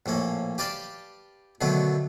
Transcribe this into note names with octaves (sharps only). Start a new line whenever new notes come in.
A#1 A2 A#3 C#4
G4 B4 D5 F5 G5 A5
B2 D3 D#3 F#3 A3 B3